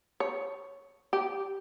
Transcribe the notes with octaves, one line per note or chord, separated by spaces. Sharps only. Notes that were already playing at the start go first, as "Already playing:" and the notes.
C#5
G4